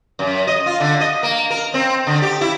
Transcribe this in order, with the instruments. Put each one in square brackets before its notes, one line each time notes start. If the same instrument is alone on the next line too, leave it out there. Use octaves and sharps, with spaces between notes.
[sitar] F#2
D#5
F4
D3
D#5
A#3
A#4
C4
D3
G4
E4